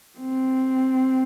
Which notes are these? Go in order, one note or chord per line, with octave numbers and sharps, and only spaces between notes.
C4